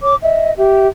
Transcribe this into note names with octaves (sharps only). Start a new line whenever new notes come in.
C#5 D6
D#5 E5
G4 E5